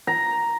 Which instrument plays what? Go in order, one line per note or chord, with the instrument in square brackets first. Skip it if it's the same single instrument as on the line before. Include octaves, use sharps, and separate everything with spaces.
[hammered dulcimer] A#5